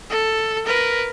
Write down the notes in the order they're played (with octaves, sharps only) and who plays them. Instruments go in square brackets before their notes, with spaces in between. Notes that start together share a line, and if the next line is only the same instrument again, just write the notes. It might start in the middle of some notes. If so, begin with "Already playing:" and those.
[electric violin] A4
A#4 B4